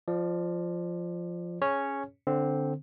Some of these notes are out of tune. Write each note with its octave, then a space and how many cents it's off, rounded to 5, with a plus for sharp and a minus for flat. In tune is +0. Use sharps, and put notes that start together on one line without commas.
F3 +0 D5 +30
C#4 +0 G#4 +0 C#5 +0
D3 +0 C4 +0